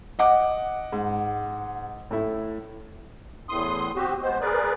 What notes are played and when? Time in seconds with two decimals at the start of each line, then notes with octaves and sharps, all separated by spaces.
0.19 D#5 F#5 D6
0.92 G#2
2.11 A2 A3 E4
3.49 E2 A2 C6 D#6
3.96 C4 F#4 G4
4.22 G#3 B3 C5
4.41 G#4 A#4 B4 D5